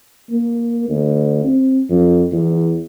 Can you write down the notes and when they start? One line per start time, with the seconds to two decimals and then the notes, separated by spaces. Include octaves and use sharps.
0.30 A#3
0.89 D2
1.44 C4
1.90 F2
2.32 E2